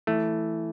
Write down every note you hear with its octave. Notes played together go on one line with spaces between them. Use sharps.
E3 A3